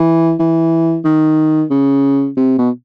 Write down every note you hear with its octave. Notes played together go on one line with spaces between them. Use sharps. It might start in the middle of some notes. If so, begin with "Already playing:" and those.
Already playing: E3
E3
D#3
C#3
C3
B2